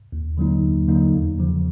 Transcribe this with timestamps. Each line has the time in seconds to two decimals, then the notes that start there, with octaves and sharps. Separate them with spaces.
0.12 D#2
0.37 D3 F#3 A#3 D#4
0.63 D#2
0.88 D3 F#3 A#3 D#4
1.13 E2
1.39 C#3 F3